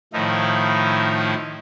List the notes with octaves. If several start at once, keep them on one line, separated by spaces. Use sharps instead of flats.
A2 D#3 F3 D#4 E4